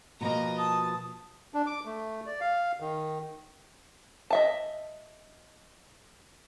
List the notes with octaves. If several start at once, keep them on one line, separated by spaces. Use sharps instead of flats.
B2 F3 A#3 D#5 A#5
A5 D#6
D4
D6
A3
D5
F5
D#3
D#5 E5 A5